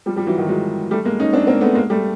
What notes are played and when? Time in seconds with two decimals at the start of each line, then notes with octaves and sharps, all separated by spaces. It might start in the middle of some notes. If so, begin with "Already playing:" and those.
0.06 F3 G3
0.16 F3 G3
0.26 E3 F#3
0.38 D#3
0.48 F#3 G#3
0.91 G3 A3
1.05 G#3 A#3
1.20 C#4 D#4
1.33 C4 D4
1.47 A#3 C4
1.61 A3 B3
1.75 G#3 A#3
1.90 G3 A3